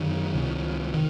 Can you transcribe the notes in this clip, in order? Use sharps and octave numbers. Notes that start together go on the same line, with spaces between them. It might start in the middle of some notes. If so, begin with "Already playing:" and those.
Already playing: F#2 D3 D#3
C#2 C3
D#3